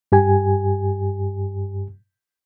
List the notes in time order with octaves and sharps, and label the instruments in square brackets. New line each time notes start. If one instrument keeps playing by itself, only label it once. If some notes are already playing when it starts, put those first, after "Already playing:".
[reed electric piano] G2 G4 G#5